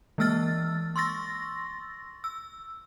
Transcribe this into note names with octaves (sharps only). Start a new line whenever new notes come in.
E3 G#3 A#3 E6 F6 A6
C6 C#6 E6 A6 A#6
E6